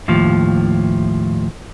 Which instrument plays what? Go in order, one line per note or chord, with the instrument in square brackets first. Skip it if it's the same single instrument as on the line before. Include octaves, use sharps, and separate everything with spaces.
[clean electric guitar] D#2 A2 F3